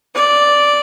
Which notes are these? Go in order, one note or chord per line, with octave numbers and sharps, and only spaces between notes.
D5